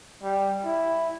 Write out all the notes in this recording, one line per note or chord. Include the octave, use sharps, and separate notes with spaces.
G3
E4